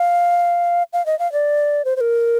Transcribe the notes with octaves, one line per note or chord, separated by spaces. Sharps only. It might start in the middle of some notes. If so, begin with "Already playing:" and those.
Already playing: F5
F5
D#5
F5
D5
C5
C5
A#4